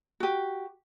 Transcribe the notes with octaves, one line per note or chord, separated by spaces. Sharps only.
F#4 G4